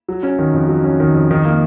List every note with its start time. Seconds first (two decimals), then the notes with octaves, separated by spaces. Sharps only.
0.08 F#3
0.23 C#4
0.39 D#3
0.53 F2
0.69 F#3
0.84 C#4
1.00 D#3
1.14 F2
1.31 D#3
1.45 A#3